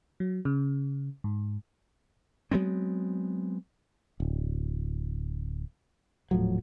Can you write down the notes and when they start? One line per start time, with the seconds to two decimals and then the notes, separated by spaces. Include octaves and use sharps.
0.20 F#3
0.45 C#3
1.24 G#2
2.51 F#3 G#3 B3 C4
4.20 D1
6.31 D#1 A2 F3 F#3